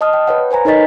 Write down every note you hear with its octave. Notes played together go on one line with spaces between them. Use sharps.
D#5 A5 D#6 F6
G5
B4 C#5 F#5
B4 C5 G#5 A#5
D#4 A#4 C#5 D#5 A6 B6